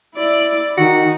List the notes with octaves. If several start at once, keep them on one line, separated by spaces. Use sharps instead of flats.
E4 D5
D#3 D#4 F#4